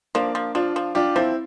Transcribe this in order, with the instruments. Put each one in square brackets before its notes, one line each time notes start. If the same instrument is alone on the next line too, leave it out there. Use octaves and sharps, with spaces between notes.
[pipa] F3 [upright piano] A#3 D4
[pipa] F3
[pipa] F3 [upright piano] D4 F4
[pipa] F3
[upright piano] D4 F4 [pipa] G4
[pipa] F3 [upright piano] C4 E4